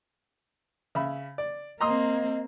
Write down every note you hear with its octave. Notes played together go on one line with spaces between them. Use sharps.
C#3 E5 B5
D5
A#3 C4 D#5 A#5 C6 D#6